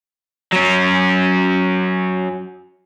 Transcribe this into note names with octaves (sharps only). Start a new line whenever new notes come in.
F#3 C#4